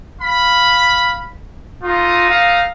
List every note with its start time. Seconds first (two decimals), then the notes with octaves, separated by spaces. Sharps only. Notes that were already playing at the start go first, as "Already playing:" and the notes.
0.20 F5 B5
1.83 A3 D#4 F4 D#6
2.30 F5